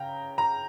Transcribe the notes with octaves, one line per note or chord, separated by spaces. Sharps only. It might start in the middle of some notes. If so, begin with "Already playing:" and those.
Already playing: C#3 G5 A#5
A#5